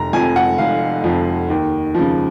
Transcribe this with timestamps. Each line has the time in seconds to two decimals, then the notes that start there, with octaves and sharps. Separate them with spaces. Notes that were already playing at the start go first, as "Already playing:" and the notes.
Already playing: F1 A#5
0.13 F2 F3 G#5
0.36 F#5
0.58 F1 F5
1.04 F2 F3
1.50 D#2
1.95 C#3 F3